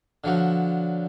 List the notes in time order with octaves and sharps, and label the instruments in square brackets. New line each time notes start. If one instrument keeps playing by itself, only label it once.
[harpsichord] D3 F3 F#3